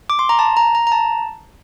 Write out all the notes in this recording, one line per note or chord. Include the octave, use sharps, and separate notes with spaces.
D6
C6
A#5
A5
A#5
A#5
A#5
A5